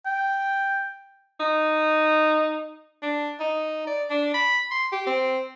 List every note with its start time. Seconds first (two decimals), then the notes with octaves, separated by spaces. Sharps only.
0.06 G5
1.40 D#4
3.02 D4
3.40 D#4
3.87 D5
4.10 D4
4.34 B5
4.71 C6
4.92 G4
5.07 C4